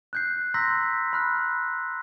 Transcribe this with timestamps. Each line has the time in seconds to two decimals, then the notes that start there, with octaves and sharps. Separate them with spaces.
0.13 F#6 G6 C7
0.54 A#5 C6 E6 G6 A#6 B6
1.13 B5 F6 F#6